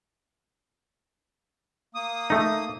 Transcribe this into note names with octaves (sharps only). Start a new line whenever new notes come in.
A#3 D#6
A3 D#4